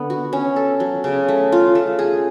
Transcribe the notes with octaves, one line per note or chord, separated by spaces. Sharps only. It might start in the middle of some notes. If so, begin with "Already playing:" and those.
Already playing: D3 B3
F#4
C#4
A4
F#3
C#3
A3
F4
A3
G#4